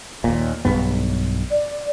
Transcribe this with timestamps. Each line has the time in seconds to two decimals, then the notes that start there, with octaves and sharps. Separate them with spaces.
0.24 D#2 A#2
0.65 B1 G2 B3
1.50 D5